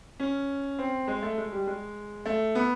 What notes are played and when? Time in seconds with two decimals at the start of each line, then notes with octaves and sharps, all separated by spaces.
0.20 C#4
0.79 C4
1.07 G#3
1.22 A3
1.38 G#3
1.52 G3
1.67 G#3
2.26 A3
2.55 B3